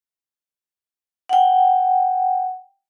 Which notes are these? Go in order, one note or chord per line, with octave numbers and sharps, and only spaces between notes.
F#5 G5